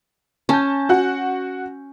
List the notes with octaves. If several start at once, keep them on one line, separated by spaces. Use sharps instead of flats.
C#4 A5 G6
F#4 F#5